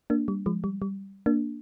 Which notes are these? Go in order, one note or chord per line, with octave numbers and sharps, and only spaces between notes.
A#3 D4
G3
F3 G#3
G3
G3
A#3 D4